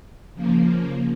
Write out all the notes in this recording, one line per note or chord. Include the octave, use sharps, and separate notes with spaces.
C#3 F3 A#3